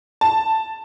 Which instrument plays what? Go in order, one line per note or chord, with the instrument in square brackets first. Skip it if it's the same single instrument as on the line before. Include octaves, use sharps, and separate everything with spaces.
[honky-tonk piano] A5